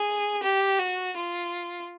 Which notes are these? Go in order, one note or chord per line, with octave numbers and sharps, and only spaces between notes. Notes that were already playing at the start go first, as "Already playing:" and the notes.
Already playing: G#4
G4
F#4
F4